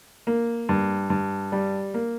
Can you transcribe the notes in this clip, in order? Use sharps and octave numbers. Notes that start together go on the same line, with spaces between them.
A#3
G2
G2
G3
A#3